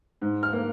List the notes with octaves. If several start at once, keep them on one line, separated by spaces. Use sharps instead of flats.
G#2
F6
A#3